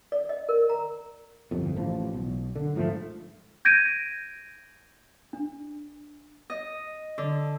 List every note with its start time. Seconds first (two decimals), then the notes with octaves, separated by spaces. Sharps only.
0.12 D5
0.29 D#5
0.49 A#4
0.69 A#5
1.51 G1 C2 F2
1.77 A1 F3
2.13 B1
2.56 D3
2.75 D1 G#2 F3 A3
3.65 G6 G#6 A#6 D7 D#7
5.33 D4
6.50 D#5
7.18 D3